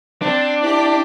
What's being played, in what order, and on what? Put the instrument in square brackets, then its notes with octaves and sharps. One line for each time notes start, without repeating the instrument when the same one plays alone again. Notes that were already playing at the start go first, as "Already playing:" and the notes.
[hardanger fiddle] C4 [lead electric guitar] D4
[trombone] E4 [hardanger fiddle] G4 D6